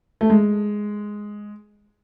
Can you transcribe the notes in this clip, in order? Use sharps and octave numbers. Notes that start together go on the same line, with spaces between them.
A3
G#3